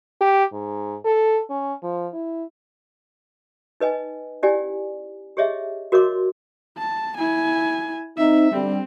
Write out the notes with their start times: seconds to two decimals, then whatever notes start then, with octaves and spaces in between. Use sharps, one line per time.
0.21 G4
0.52 G#2
1.05 A4
1.50 C#4
1.83 F3
2.13 E4
3.80 D#4 B4 D#5 G#5
4.43 C#4 E4 G4 D5 G#5
5.37 G4 G#4 C#5 D#5 E5
5.92 F#4 A#4 C#5 D#5 C6 D6
6.78 A5
7.18 E4 G#5
8.18 C4 D#4 E5
8.52 D3 G3 C4